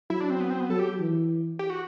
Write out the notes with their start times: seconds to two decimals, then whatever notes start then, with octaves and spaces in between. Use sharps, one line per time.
0.10 F#3 E4
0.20 D4
0.30 C4
0.40 B3
0.50 C4
0.60 B3
0.70 F#3 A4
0.79 G4
0.99 E3
1.59 G4
1.70 F#4